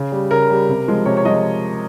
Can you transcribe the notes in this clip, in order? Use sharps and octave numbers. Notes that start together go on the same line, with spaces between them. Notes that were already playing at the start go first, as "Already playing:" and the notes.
Already playing: C#3
G3
C#3 A#4
G3
C3
F3 G#3
C3 C#5
C#5
F3 G#3 D#5